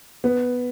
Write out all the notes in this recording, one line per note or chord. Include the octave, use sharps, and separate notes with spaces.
B3